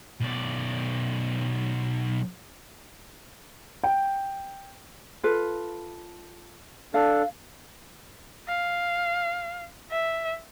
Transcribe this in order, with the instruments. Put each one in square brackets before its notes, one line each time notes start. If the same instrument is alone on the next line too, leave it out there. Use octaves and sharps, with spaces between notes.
[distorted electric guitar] B1 D5
[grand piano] G5
[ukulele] F4 A4 B4
[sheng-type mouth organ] D4 A4 [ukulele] F5
[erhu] F5
E5